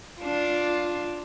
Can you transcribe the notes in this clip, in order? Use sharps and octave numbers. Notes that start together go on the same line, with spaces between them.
D4 F4